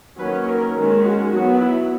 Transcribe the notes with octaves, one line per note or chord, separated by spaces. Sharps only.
D#3 F#3 A#3 C#4 B4
A#4
D#3 G#3 C#4
F#4
F#3 B3 F#4
E4